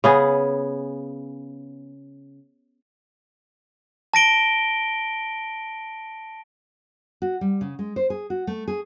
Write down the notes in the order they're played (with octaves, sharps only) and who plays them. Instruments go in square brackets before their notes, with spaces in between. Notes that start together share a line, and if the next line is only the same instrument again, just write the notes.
[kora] C#3 B3 G#4
[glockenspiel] A5 A#6 D7 G7
[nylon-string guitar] F#4
G3
C#3
G#3
C5
G#4
F#4
A3
G#4